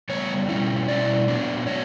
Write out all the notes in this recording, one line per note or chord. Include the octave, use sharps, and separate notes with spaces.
C#3 G3 B3 C#5
B2 G3 C#4 E4
B2 G3 C#4 E4 D5
A#2 F#3 B3 D4
F#3 B3 D4 C#5